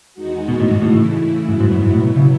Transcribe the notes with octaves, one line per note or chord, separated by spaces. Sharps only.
E2 D#3 G#3 D#4 F#4
B2
A2
G#2
A2 C#3 E3 A3 E4
G#2 B2 F#3 B3 E4
G#2
F#2
G#2
A2
B2
C#3